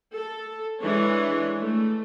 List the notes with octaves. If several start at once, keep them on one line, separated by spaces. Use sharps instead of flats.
A4
E3 G#3 D4 C#5
A3